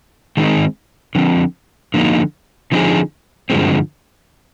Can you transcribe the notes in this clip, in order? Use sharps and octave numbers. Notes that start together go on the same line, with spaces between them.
D#3 G#3 C4 D#4
D3 F3 C4
D3 F3 A#3 D#4
D3 F3 C4 D#4 G#4
G2 D3 F3 G#3 C4